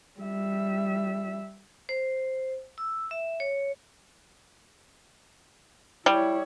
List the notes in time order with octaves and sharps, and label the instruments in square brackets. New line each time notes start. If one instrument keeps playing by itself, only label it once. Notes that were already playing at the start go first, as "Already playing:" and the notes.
[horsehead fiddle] G3 E5
[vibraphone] C5
E6
E5
C#5
[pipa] G3 [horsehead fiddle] E4 C#5